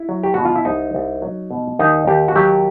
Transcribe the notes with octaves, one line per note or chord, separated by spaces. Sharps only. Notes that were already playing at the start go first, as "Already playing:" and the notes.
Already playing: E4
F#3
G4
B2 F#4
F4
E4
C2 D#4
C2
F#3
B2
D#2 D#4
D#2 G4
F#4
F#3 G4